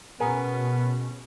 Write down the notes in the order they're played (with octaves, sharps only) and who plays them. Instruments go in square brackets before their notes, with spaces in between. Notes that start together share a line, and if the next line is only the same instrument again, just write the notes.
[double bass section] B2 C#4 [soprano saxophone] B3 [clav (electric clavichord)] G#4 A#4